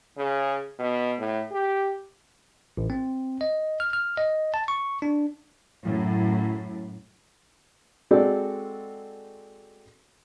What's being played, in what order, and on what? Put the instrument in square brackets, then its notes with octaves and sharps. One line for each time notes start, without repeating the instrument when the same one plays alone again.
[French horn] C#3
B2
A2
G4
[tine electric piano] A1
C4
D#5
F6
F6
D#5
A5
C#6
D4
[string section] F#2 A2
[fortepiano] G#3 C4 F#4 A4 D5